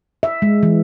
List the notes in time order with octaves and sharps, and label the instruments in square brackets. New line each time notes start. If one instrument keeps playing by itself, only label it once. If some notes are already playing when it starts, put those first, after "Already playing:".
[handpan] E5
G#3
E3